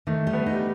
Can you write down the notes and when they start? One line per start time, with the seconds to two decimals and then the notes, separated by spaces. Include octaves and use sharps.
0.07 D#3 A3
0.27 G3
0.33 B3
0.46 D#4
0.52 G3